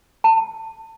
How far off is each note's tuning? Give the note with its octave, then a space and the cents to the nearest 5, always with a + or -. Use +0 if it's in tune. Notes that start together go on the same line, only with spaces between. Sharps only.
A5 +25